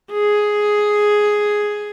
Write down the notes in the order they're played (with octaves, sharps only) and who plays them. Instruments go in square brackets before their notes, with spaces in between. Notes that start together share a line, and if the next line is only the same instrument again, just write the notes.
[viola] G#4